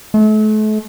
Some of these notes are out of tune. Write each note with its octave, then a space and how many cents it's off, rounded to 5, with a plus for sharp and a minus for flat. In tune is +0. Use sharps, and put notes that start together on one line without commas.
A3 -40